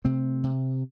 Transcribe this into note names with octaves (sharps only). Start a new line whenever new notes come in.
C3 A3 C4
C3